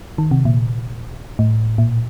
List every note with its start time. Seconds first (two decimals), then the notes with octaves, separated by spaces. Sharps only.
0.18 D#3
0.31 C3
0.45 A#2
1.39 A2
1.78 A#2